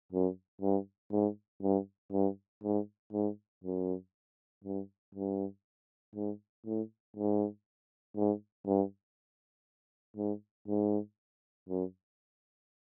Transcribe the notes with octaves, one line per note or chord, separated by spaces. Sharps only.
F#2
G2
G#2
G2
G2
G#2
G#2
F#2
G2
G2
G#2
A2
G#2
G#2
G2
G#2
G#2
F#2